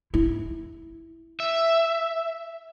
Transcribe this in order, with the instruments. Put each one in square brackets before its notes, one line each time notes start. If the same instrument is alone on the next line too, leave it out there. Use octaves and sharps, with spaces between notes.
[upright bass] E4
[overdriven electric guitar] E5